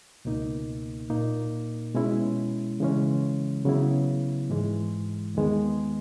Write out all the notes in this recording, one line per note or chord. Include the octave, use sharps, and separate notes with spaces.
C#2 B2 A#3 D#4
A#2 A#3 D#4
B2 G#3 C#4 E4
C#3 E3 G#3 C#4
C#3 F#3 B3 E4
G#2 E3 G#3
D#2 D#3 G#3 B3